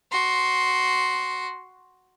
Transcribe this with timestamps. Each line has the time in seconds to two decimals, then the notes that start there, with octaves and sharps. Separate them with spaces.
0.12 F#4 C6